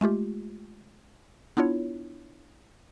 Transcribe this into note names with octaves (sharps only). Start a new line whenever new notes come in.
G#3 A3 F4 G4
B3 D4 E4 F4 C#5